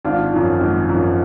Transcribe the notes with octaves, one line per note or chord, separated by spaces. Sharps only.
G#1 D4 F4
F#2 F3
G#1
F#2 F3